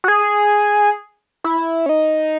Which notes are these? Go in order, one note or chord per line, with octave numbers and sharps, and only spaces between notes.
F#4
G#4
E4
C#4
D#4